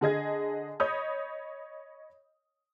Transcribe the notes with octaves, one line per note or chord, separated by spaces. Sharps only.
D3 G#4 D#5 G#6
C#5 D#5 B5 D#6 G6